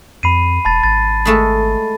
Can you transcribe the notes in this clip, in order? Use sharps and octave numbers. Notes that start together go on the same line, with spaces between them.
F2 B5 C7 D#7
E1 A5 B5 A6
G#1 A6
G#3 A3 A4